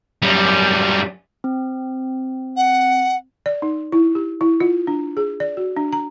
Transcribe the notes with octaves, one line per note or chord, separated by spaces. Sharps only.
F#2 G3
C4
F#5
D5
D#4
E4
G4
E4
F4
D4
G#4
D5
F#4
D4
A#5